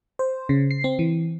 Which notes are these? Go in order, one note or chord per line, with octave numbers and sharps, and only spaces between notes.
C5
C#3
C7
C4
E3